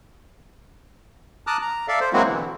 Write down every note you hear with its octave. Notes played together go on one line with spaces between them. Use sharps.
A5 A#5 D6 D#6 F6 F#6
A#5
A4 D5 E5 F5
C5
F#3 G#3 A#3 C4 E4 F#4
B2 D3 E3